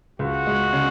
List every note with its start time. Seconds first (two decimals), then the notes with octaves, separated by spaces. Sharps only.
0.19 C#2 F#4
0.47 G#3
0.73 C#3